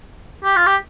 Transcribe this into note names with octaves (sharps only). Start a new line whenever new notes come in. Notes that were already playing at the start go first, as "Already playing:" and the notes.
G4
F4
G4